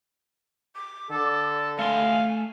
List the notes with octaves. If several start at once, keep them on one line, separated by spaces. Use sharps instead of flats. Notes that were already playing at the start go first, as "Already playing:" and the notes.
D6
D3 A4
A3 F5 G#5 C6